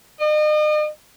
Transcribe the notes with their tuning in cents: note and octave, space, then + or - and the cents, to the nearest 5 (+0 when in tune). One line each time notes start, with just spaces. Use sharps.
D#5 -40